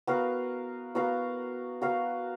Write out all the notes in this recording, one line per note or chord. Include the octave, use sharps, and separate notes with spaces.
B3 F#4 A#4 F5
B3 F#4 A#4 F5
B3 F#4 A#4 F5